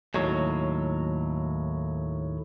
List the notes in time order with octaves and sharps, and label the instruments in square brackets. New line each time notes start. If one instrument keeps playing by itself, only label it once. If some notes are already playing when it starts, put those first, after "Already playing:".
[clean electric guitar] D#2 A2 F#3